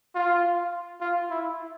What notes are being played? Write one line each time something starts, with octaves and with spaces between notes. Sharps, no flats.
F4
F4
E4